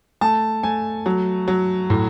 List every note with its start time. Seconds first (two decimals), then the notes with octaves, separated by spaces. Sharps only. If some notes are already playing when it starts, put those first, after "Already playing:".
0.21 A3 A5
0.63 A3 G#5
1.06 F#3
1.48 F#3
1.90 A2